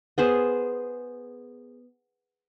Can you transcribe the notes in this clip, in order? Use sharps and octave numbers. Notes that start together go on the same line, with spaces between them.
B3 G#4 C5